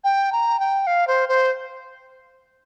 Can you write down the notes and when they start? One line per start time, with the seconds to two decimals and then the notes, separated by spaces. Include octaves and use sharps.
0.04 G5
0.32 A#5
0.60 G5
0.87 F5
1.07 C5
1.29 C5